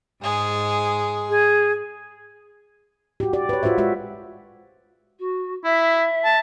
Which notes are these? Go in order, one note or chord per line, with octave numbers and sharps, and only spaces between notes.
G#2 G#3 G#4
G#4
F#4 G4
G4 D5
B4 C#5
F4 F#4 B4 C5 E5
G#3 F4 F#4 E5
F#4
E4 E5
A5